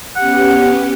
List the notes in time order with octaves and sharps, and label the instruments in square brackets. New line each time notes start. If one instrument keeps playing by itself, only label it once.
[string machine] B3 C#4 G4 [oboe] F#5